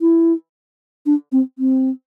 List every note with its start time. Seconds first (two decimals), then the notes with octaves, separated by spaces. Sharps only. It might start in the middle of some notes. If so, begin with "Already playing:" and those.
0.01 E4
1.06 D4
1.32 C4
1.59 C4